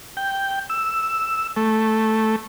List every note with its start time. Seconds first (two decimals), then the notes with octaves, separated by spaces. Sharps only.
0.17 G5
0.70 E6
1.56 A3